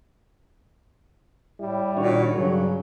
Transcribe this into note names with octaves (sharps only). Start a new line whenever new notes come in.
A2 G3 E4
A#2 D#3 D4 F#4 C#5
G2 C#3 F#3